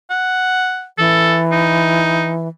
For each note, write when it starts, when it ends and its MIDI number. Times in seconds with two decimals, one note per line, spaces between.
0.10 0.86 78
0.98 2.48 52
0.98 1.41 69
1.52 2.32 63